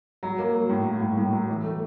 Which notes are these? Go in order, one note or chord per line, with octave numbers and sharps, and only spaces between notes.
F#3
A#3
F#3
A2
F#3
A2
A2
F#3
E3
A3